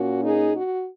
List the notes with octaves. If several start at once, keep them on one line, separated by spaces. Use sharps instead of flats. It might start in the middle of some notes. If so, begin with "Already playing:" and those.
Already playing: A#2 A#3 C#4 F#4
D#4 G#4
F#4